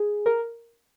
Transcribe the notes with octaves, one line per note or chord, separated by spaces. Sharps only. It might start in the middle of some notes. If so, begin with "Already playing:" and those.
Already playing: G#4
A#4